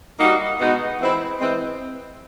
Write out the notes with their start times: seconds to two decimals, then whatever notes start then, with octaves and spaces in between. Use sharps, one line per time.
0.19 G3 A#3 D#4 F#4
0.59 B2 G#3 B3 D#4 F#4
0.99 E3 G#3 C4 E4
1.39 E3 G#3 C4